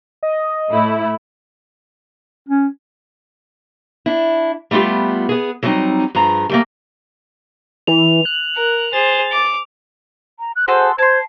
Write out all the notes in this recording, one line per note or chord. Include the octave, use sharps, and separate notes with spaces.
D#5
A2 A3 E4
C#4
D4 E4
G3 A3 B3 F4 G4
B3 G#4
F#3 G3 C4 D#4
G2 F3 G#4 A#5
G3 A3 A#3
E3 F7
F#6
A#4
G#4 C5 A6
D6
A#5
F#6
F#4 G#4 A4 C5 C6
C5 A5 C6 G#6